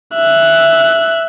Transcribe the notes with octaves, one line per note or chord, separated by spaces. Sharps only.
E5 F#6